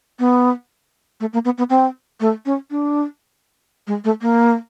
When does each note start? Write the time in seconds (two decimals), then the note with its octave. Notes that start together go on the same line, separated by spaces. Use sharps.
0.19 B3
1.20 A3
1.33 A#3
1.45 B3
1.58 B3
1.70 C4
2.20 A3
2.46 C#4
2.71 D4
3.87 G#3
4.04 A3
4.22 A#3